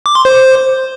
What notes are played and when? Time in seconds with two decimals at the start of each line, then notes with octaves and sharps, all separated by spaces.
0.06 D6
0.15 C6
0.25 C5